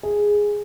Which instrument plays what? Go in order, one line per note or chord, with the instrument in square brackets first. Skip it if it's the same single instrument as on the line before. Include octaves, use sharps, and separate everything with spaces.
[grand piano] G#4